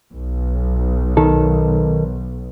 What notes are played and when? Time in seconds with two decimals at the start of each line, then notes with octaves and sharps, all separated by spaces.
0.12 B1
1.17 D#3 A4